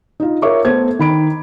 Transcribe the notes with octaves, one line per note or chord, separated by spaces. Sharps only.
D#4 F4
F4 A#4 C#5 E5 C#6 D6
A3 B3 A4 C5 G#6
D#3 B5 D7